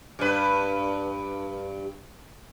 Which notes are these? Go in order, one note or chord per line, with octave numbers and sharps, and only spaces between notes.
G2 B4